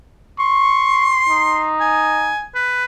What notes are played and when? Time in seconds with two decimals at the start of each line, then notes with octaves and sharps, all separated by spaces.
0.39 C6 C#6
1.29 D#4
1.80 G#5
2.55 B4